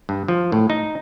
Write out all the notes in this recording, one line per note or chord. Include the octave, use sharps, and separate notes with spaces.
G2
F3
A2
D#4